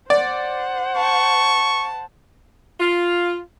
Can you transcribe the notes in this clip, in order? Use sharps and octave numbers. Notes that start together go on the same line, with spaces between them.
C5 D5 F#5
A5 C#6
F4